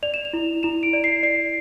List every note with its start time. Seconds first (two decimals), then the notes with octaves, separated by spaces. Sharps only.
0.03 D5 F7
0.14 E7
0.25 F7
0.33 E4
0.63 E4 E7
0.83 D7
0.93 D5
1.04 C7
1.23 D5 C7